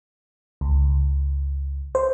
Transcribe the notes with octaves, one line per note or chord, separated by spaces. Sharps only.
C#2
C5